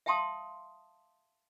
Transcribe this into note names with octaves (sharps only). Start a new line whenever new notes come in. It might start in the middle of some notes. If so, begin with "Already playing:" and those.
E5 F5 G5 A5 C6 D#6